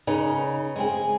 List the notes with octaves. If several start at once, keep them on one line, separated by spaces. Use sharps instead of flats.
C#3 D#4 B4
G#3 C4 G#4